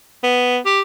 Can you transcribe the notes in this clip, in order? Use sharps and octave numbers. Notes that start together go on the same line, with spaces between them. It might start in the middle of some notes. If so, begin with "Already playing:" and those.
B3
G4